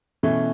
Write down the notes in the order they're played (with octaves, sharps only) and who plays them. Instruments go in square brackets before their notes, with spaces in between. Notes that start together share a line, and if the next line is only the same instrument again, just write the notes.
[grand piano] B2 [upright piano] E3 A3 C#4